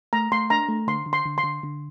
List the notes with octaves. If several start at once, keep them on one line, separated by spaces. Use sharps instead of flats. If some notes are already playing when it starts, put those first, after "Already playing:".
A3 A#5
A3 C6
D4 A#5
A3
D3 C6
D3
C6
D3
C6
D3
D3